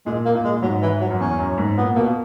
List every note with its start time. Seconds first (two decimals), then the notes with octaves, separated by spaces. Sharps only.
0.06 A#2 G#3
0.25 A#3
0.35 A#2
0.44 G#3
0.62 G#2 F#3
0.82 E3
1.01 F#3
1.11 F#2
1.20 E2 C#4
1.39 F#2
1.58 G#2
1.78 A#2 B3
1.96 B2 A#3